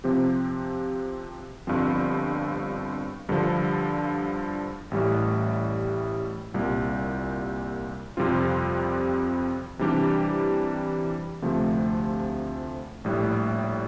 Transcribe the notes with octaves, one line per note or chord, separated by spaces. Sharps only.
C3 F3 C4 G4
G1 G2 F3 C4
G2 D3 F3
A1 A2 G3
C2 A#2 G3
F2 C3 G3 C4 F4
C3 E3 G3 D4 G4
D2 C3 F3 A3
A#1 A2 G3